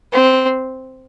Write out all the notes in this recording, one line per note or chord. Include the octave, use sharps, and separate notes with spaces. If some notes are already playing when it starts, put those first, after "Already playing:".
C4